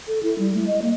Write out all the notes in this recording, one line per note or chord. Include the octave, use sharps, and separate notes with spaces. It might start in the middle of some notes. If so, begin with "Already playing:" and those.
A4
E4
G3
A3
D#5
A#3